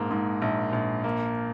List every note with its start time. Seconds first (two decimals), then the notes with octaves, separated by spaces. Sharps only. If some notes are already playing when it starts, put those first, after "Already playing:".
Already playing: A#1 G#2 A#3
0.11 G#2
0.42 A#1
0.73 A#1
1.04 A#3